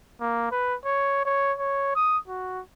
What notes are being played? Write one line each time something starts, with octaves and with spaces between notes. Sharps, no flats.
A#3
B4
C#5
C#5
C#5
D#6
F#4